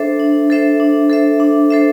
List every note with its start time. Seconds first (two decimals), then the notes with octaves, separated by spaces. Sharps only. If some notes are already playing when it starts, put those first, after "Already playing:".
Already playing: D4 A4 C5 E5
0.19 D4
0.50 A4 C5 E5
0.80 D4
1.10 A4 C5 E5
1.40 D4
1.70 A4 C5 E5